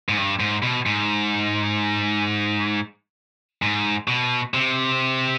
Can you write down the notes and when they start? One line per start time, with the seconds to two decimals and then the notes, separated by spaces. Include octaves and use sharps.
0.09 G#2
0.17 G2
0.40 G#2
0.63 B2
0.86 G#2
3.62 G#2
4.08 B2
4.54 C3